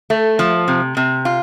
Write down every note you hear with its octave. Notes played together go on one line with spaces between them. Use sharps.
A3
F3
C3
C3
F4